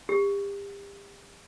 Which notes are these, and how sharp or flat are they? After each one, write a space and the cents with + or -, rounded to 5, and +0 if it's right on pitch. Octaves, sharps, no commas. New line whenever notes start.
G4 +35